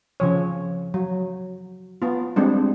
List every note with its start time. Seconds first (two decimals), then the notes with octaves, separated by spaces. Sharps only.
0.20 C#3 F3 C#5
0.94 F#3
2.02 B3 F4
2.36 G3 G#3 C4 D4